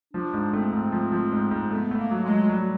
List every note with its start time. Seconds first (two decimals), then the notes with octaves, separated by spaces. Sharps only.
0.14 F3 D4
0.34 G#2
0.53 A3 C4
0.73 G#2
0.92 F3
1.12 F3
1.32 G#2
1.51 G#2
1.71 A3 B3
1.91 A3
1.97 A#3
2.11 F#3
2.24 G#3
2.30 F#3
2.49 F#3 G3